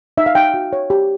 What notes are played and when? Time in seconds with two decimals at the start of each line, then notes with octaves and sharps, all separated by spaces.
0.18 D#4 E5
0.26 F5
0.35 D#4 G5
0.54 F#4
0.73 C#5
0.90 G4